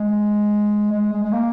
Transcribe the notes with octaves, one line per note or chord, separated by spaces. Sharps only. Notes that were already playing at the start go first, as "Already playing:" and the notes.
Already playing: G#3
G#3
G#3
G#3
A#3